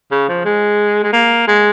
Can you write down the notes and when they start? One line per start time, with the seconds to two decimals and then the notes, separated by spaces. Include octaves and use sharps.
0.11 C#3
0.29 F3
0.45 G#3
1.03 G#3
1.13 A#3
1.48 G#3